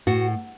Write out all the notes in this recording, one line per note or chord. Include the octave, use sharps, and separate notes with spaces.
A2 F#4